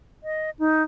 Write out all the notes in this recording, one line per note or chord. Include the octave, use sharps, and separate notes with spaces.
D#5
D#4